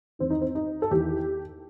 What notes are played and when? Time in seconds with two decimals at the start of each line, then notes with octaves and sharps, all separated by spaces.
0.19 E2 D#3 C4
0.30 D#4
0.41 C4
0.55 D#4
0.82 A4
0.91 E2 D#3 G4